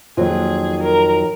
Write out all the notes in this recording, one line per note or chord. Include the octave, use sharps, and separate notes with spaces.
F2 D#3 F#3 A#3 F4 G#4
A#4